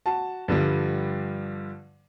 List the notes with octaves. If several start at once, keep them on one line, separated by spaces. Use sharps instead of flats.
F#4 A5
G2 D3 F3 G3